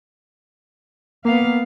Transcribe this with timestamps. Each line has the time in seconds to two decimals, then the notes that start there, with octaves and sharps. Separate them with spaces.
1.25 A#3 B3 F5